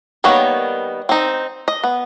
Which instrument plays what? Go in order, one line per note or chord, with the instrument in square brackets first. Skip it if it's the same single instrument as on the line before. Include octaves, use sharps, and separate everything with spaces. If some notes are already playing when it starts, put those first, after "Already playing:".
[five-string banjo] D#3 G3 A#3 B3 C#5
C4 D#4
D#5
B3